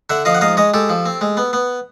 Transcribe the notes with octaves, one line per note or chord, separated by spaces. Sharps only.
D3 E5 F#5
F3 D#5 F5
F#5
G#2 D#5 F5
G#3 C#5 D#5
G#3 G4 A4
F3
C4
G#3
B3
B3